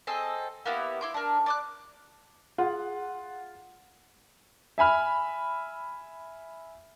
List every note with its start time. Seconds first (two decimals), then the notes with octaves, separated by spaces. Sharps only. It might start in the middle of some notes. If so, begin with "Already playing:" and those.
0.07 C4 G#4 A4 D#5
0.65 A#3 B3 E4 G4
1.01 E4 C6 D6
1.14 D4 A#4
1.46 D5 D6 F#6
2.58 F4 G#4 F#5
4.78 E5 G#5 B5 F6